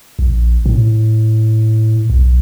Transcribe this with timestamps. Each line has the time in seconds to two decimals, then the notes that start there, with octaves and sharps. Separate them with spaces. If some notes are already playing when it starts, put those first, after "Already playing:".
0.19 A#1
0.66 A2
2.10 B1